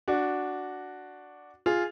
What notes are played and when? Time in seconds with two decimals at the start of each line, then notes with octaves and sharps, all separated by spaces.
0.08 D4 F#4
1.66 F4 G#4